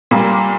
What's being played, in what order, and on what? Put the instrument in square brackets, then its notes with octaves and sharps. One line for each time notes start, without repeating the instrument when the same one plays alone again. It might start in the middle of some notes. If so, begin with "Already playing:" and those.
[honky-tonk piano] A#2 G3 A#3